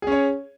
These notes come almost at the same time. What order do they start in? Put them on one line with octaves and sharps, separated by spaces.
G#4 C#4 C#5